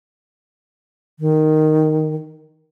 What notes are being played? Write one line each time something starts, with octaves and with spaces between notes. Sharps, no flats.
D#3